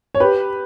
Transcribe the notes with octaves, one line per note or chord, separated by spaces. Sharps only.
C#5
G4 B4